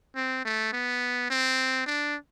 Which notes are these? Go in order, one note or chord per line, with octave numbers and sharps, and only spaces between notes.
C4
A3
B3
C4
D4